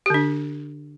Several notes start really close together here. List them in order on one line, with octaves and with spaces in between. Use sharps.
G4 D3 D4